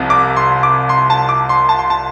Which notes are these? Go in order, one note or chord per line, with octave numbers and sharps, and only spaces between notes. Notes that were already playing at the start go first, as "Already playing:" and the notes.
Already playing: C2 C3 F3
D6
C6
D6
C6
A5
D6
C6
A5
C6
A5